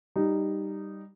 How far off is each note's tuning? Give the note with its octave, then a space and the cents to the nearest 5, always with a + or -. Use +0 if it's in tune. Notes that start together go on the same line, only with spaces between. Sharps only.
G3 +0 D#4 -10